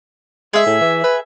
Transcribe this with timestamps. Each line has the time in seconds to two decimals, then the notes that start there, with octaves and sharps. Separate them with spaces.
0.53 G#3 G#4 E5
0.66 A2
0.81 E3
1.04 B4